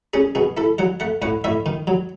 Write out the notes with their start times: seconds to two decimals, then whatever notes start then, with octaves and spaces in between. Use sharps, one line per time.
0.14 C#4 G#4
0.35 B2 G#4
0.57 E4 A4
0.78 F#3 F#5
1.00 A3 F#5
1.22 A2 F#5
1.44 A2 E5
1.66 D#3
1.87 F#3